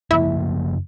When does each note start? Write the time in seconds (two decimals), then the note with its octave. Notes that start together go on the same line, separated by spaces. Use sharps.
0.11 F#2 C#3 F3 A#3 E4 E5